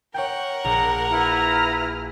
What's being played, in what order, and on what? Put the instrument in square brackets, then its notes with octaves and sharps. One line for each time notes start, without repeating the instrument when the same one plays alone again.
[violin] A#4 F#5 [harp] C#5 G5
[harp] A#1 [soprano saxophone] A#5
[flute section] E4 B4 F6